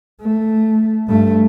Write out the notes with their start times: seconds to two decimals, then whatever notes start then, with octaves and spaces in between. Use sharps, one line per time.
0.21 A3
1.07 G2 A3